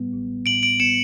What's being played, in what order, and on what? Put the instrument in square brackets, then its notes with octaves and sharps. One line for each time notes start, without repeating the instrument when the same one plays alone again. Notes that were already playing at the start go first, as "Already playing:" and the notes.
Already playing: [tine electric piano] A2 G3 B3
A1
[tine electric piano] A2 [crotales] D7 F#7
[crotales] D7 F#7
[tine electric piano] B3 [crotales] C#7 E7